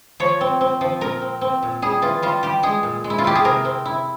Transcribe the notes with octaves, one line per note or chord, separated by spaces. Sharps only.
F3 C#5
C4
C4
F3
A#2 A#4
C4
C4
A#2
G3 G#4
E3 F4
G3 F4
G3 G4
G#3 G#4
A#2
G#3
E4
F4
E4 G4
G#4
C3 A#4
C4
E4